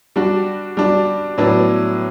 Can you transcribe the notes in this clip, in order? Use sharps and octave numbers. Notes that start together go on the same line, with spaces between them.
G3 D4 F#4
G3 D4 F#4
A2 F#3 B3 D4